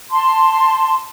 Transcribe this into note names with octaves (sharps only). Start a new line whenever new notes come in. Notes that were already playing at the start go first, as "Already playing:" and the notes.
A5 C6